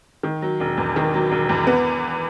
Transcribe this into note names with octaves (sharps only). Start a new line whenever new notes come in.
D#3
F#3
E1
E2
D#3
F#3
E1
E2
B3